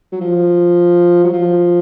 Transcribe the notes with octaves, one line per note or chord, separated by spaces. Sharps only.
F#3
F3
F#3
F3